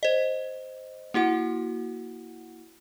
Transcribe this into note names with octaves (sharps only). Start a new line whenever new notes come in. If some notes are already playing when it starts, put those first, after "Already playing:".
C5 D#5
A#3 E4 F#4 F#5